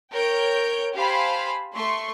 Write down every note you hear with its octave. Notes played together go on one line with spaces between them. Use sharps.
A#4 C#5 G5 G6 D7
G4 C5 F5 G#5 A5 B5
A3 C6 C#6